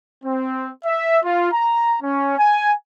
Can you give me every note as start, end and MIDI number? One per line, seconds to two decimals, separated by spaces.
0.24 0.68 60
0.85 1.19 76
1.23 1.48 65
1.52 1.96 82
2.01 2.35 61
2.38 2.72 80